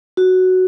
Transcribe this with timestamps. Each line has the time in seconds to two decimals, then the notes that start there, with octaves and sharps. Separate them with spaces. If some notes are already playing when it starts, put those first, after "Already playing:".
0.17 F#4